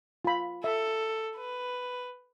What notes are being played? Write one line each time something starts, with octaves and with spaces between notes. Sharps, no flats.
F4 B5
A4 E5
B4